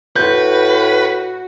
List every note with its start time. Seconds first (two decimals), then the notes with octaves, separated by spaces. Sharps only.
0.16 A2 F#4 B4 G6